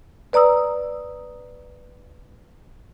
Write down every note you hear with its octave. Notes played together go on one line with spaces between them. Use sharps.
B4 D5 A#5 D#6 E6